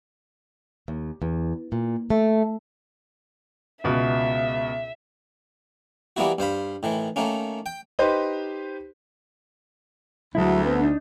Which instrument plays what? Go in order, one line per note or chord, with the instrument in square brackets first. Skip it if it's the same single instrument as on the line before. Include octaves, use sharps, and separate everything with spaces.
[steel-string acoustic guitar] D#2
E2
A#2
A3
[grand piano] C#2 B2 [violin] E5
[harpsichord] E3 G3 A#3 B3 E4 F#4
G2 C5 F5 B5
A2 D#3 E3
D#3 A3 A#3 C#4
G5
[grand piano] D#4 G4 B4 C5
[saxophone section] D2 [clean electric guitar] F#3 G#3 E4
[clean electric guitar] B3 C4 B4
D4 D#4